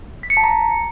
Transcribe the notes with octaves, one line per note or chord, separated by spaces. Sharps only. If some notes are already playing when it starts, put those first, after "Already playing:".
B6
C#7
A5
A#5